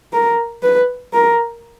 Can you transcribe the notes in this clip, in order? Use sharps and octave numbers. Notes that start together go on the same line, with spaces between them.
A#4
B4
A#4